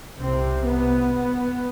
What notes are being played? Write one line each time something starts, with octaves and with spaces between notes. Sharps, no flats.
C2 C3 C4
B3